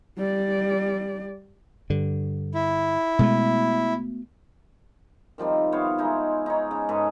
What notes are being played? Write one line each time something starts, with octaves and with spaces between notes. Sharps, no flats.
G3 D5
G2 D3
E4
B2 G#3 A3
D#3 F3 G3 C4
B3 C5 C#5 F5
G#3 D#4 E4
D#4 C#5
C#3
G#2 A4 B4 G#5